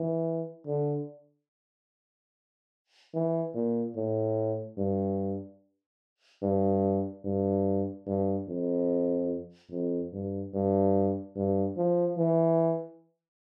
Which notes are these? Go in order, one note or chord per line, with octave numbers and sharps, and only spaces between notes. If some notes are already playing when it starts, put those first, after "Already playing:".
Already playing: E3
D3
E3
A#2
A2
G2
G2
G2
G2
F2
F2
G2
G2
G2
F3
E3